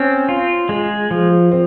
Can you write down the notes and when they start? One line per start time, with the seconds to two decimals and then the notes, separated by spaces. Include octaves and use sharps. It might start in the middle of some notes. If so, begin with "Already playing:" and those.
Already playing: C4 C#4
0.29 F4
0.69 G#3
1.11 F3
1.51 C4